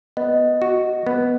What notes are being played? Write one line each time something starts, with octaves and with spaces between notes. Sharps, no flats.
B3 D#5
F#4
B3